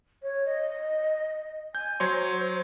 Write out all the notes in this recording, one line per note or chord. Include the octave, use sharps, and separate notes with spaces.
C#5
D#5
G#5 G6
F#3 C5 C#5 C6